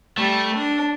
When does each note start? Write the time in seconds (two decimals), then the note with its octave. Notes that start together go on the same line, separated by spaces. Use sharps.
0.18 G3 A3
0.54 D4